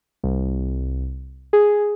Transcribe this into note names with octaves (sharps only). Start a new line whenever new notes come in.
C2
G#4